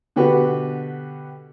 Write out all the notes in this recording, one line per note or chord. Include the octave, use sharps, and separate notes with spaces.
B2 D3 F#4 G4 B4